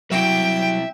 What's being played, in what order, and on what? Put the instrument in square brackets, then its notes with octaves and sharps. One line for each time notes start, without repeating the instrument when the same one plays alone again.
[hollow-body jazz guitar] F#3 [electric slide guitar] G3 C4 E4 [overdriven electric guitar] E5 [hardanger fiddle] G5